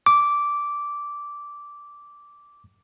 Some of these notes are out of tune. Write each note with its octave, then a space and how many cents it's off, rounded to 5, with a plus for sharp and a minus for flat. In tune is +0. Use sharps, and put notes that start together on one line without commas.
D6 -10